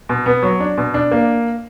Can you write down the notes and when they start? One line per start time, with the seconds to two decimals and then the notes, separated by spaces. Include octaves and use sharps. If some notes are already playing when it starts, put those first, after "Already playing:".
0.09 B2
0.26 B3
0.43 F#3
0.60 D4
0.77 B2
0.94 D4
1.11 A#3